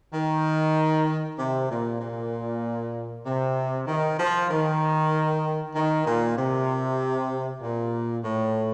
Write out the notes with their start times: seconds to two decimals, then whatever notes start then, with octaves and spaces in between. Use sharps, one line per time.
0.13 D#3
1.39 C3
1.70 A#2
2.00 A#2
3.26 C3
3.87 D#3
4.19 F3
4.50 D#3
5.75 D#3
6.06 A#2
6.37 C3
7.62 A#2
8.24 A2